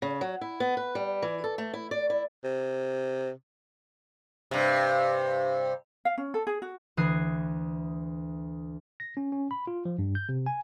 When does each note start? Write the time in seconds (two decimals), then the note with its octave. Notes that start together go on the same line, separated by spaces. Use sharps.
0.02 C#3
0.21 F#3
0.41 E4
0.60 B3
0.77 B4
0.95 G3
1.22 E3
1.44 A4
1.58 A3
1.74 E4
1.91 D5
2.10 E4
2.44 C3
4.51 G2 C3
6.05 F5
6.18 C#4
6.34 A4
6.47 G#4
6.62 F#4
6.97 D2 E3 D#6 F#6 G#6 C7
9.00 A#6
9.17 C#4
9.32 C#4
9.51 B5
9.67 F4
9.85 F3
9.99 G2
10.15 G6
10.29 C3
10.46 G#5